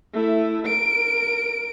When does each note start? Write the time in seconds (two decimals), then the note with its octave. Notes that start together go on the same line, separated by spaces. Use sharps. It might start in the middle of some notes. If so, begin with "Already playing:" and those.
0.14 A3 E4
0.66 A#4 D7